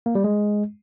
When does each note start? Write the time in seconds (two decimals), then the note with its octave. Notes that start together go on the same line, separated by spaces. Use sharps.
0.06 A#3
0.15 G3
0.24 G#3